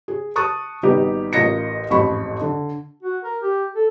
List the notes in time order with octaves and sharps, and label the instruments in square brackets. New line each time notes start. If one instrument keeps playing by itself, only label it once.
[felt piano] G#4
A5 C#6 D#6 F#6 A6
G#1 G3 B3 D#4 G4
A1 F4 A#4 D#5 A#6 C#7
A1 F2 G#2 B5 C#6
D3
[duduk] F#4
A#4
G4
A4